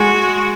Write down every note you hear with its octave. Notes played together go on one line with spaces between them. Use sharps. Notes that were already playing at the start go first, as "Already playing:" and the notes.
Already playing: G#3 F#4